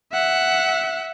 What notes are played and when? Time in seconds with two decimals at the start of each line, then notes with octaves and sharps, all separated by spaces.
0.12 E5 F#5